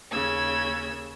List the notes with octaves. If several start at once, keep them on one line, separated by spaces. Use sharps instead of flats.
D#2 C#3 E6 G#6